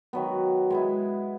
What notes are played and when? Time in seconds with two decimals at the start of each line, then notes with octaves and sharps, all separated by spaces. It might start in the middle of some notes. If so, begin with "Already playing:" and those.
0.13 D#3 F#3 B3
0.70 G#3 B3 E4